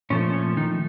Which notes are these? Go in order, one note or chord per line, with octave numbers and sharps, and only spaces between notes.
A#2 F3 A3 C#4
C#4
D#3 D#4